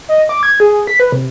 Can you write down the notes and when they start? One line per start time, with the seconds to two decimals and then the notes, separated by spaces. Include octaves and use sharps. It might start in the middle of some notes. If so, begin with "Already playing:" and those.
0.09 D#5
0.29 D6
0.43 G#6
0.60 G#4
0.87 B6
1.00 B4
1.12 C3